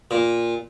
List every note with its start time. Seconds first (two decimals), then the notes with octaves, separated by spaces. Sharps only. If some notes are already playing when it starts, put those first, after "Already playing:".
0.11 A#2